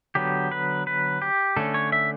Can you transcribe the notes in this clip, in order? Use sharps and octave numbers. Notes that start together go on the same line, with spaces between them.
D3 F#3 B3 G4
B4
B4
G4
D3 A3 C#4 A4
C#5
E5